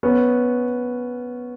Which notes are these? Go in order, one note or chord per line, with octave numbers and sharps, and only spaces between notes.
B3 C#4